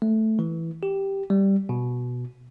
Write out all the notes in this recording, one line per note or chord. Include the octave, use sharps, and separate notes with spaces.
A3
E3
G4
G3
B2